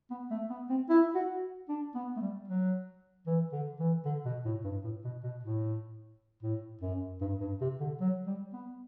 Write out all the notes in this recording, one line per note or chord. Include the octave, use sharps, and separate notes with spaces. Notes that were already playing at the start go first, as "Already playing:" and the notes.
B3
A3
B3
C4
E4
F#4
D4
B3
A3
G3
F#3
E3
D3
E3
D3
B2
A2
G2
A2
B2
B2
A2
A2
F#2
G2
G2
C3
D3
F#3
G3
B3